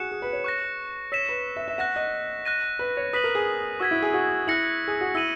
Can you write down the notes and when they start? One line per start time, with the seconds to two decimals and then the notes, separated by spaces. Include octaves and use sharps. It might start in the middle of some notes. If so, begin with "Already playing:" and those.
Already playing: F#4 G#4 F#6 C#7 E7
0.12 G#4
0.22 B4
0.33 C#5
0.44 C#6 F#6 A#6
1.12 C#5 E6 B6 E7
1.29 B4
1.56 E5
1.68 E5
1.78 F#5 F#6 A#6 E7
1.96 D#5
2.45 F#6 A#6 D#7
2.79 B4
2.97 C#5
3.13 B4 D#6 F#6 B6 D#7 F#7
3.24 A#4
3.35 G#4
3.80 F#4 C#6 E6 G#6 B6
3.91 E4
4.03 G#4
4.14 F#4
4.47 E4 F#6 A#6 C#7 F#7
4.88 G#4
5.01 F#4
5.15 E4 E6 A#6 D#7 F#7